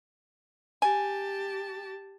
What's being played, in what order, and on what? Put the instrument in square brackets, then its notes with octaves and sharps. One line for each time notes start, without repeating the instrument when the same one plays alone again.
[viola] G4 A5 [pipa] G#5